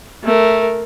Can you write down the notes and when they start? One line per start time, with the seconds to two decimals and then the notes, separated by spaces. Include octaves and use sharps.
0.24 A3 A#4